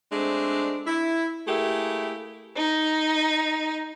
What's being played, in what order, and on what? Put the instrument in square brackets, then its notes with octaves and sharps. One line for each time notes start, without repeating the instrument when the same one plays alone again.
[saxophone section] G#3 A3 C4 D4
E4
A3 A#3 E4 G4 G#4
[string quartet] D#4